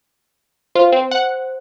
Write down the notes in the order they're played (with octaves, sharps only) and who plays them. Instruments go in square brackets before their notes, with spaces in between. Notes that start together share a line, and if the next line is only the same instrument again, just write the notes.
[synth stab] F4 [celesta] C5
[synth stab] C4
F#5